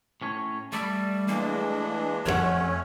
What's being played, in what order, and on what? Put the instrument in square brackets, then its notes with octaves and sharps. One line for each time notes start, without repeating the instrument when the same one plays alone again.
[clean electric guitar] A2 C#4 C#5
[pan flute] G3 [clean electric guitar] A3 D5 E5
[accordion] E3 G#3 D4 [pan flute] A#3
[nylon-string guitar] F2 A4 F#5 [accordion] A3 C#4 [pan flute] C#5